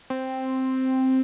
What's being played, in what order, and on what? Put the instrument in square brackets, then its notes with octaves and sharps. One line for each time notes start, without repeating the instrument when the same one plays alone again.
[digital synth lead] C4